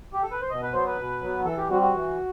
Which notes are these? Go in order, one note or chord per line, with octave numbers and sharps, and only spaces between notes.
G4
A4
B4
C5
B2 D#5
B4
F#3 B3 C5
B4
B2
F#3 B3
E3 A4
G4
G3 C4 F#4
F#4
E3